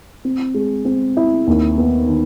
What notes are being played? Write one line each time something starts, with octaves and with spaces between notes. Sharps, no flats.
C4
G#3
C4
E4
D#2
B3
D#3